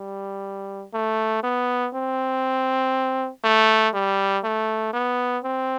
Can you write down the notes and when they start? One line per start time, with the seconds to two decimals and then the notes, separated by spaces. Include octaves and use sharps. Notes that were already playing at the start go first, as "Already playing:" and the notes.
Already playing: G3
0.94 A3
1.43 B3
1.94 C4
3.44 A3
3.94 G3
4.43 A3
4.93 B3
5.44 C4